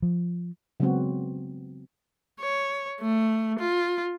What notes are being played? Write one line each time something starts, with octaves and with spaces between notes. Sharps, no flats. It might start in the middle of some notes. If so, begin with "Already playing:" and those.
F3
C#3 F#3 G#3 B3 C4 F#4
C#5
A3
F4